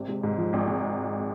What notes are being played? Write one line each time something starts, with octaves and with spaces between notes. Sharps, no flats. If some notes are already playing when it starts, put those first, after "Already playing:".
Already playing: G#1 C3
G#3
G#2
F3
G#1
G#3